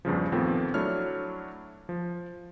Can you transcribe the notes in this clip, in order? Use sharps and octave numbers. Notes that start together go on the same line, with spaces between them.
E2 G2 C#3 F3
D#2 A#2 F3 A3 B3 C4
F#3 A3 D4 E4 C#5 F6
F3